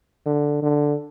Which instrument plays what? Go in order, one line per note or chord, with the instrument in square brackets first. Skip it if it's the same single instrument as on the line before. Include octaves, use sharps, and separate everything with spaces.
[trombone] D3
D3